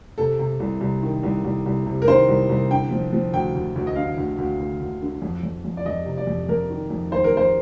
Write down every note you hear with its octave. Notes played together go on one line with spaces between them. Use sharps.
C3 A4
C3
C2
C2
D#3
C2
C2
C2
C3
A#4
D#3 C5
C2
C2
D3 G5
F3
F3
D2 G5
D2
D2
D#5
D3 F5
D2
D2
D2
D2
D3
F2
F2
F2
D5
F2 D#5
C3
D5
F2
F2 A#4
D#3
F2
D#3 C5
A#4
F2
C5